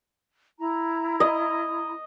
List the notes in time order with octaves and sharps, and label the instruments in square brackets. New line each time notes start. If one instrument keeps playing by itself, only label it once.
[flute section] E4 A#5
[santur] D#5